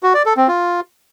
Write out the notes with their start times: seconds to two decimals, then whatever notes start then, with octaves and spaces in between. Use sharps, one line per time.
0.03 F#4
0.14 D5
0.26 A4
0.37 C4
0.48 F4